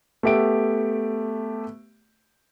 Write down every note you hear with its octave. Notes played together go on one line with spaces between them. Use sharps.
A3 B3 G4 E5 D7